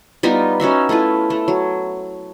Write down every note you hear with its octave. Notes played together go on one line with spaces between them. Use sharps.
G3 B3 D#4 F4
C#4 D#4 F#4 E5
A3 E4 F4 B4
A3
F#3